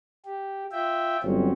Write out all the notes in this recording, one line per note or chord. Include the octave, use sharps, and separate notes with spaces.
G4
F4 E5 G5
G1 F#3 C4 C#4